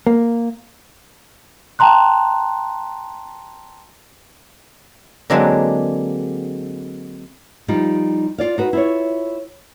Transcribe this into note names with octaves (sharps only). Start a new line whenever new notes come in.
A#3
G5 A5 A#5 C6 F#6
D3 F#3 G#3 A#3 C4 D4
F3 G3 D#4 F4 G4
F4 D5 F5
D#4 F#4 B4
E4 F4 C#5